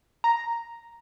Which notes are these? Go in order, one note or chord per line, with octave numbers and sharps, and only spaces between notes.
A#5